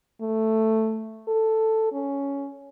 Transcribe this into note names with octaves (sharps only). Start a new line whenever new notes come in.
A3
A4
C#4